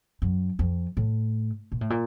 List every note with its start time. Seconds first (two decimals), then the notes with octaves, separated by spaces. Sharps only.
0.22 F#2
0.59 F2
0.97 A2
1.72 A#2
1.81 A2
1.90 A#2